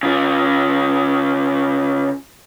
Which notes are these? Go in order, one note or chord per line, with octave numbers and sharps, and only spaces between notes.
C#3 F4